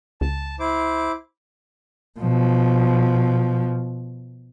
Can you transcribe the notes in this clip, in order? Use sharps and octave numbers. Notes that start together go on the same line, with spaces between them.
C#2 A5
E4 C5 D6
B2 F3